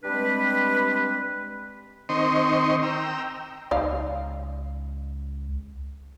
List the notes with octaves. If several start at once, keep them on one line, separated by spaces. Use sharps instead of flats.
G3 G#3 C4 D4 B4
D#3 C4 D#5 C6 C#6
G5 A#5 E6
C#2 D#4 D5 F5